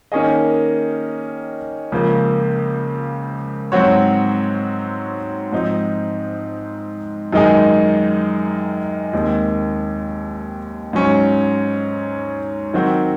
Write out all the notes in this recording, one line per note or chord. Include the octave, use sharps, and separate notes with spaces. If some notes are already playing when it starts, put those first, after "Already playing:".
D#3 A#3 C#4 G#4 D#5
C#2 C#3 F3 A#3
G#2 F#3 C4 F#4 C#5
G#2 F3 C4 D#4
F#2 D#3 G#3 D#4 G#4
D#2 D#3 G#3 C4
G#2 F#3 C#4
D#3 F#3 C4 F#4